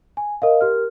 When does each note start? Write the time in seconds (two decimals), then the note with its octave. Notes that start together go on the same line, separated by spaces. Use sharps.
0.17 G#5
0.42 A#4 D#5 F5
0.61 G4 A#4 F6